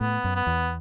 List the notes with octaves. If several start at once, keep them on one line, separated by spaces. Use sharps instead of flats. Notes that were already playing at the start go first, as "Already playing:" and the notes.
A2 B3
F#2
B3
E2